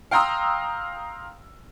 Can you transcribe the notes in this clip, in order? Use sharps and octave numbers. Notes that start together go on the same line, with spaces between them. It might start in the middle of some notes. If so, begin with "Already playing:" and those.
F5 G5 A#5 C6 D#6 E6